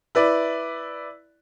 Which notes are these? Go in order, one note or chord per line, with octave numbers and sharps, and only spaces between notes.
E4 B4 D5